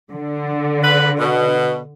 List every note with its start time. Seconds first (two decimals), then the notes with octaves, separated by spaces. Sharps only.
0.12 D3
0.83 B4
1.18 B2